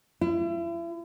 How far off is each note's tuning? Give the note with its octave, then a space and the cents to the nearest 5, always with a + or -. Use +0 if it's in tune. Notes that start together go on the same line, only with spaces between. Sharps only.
E4 +40